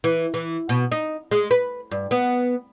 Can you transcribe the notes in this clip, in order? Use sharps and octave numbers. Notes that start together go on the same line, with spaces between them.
E3
E3
B2
D#4
G#3
B4
G2
B3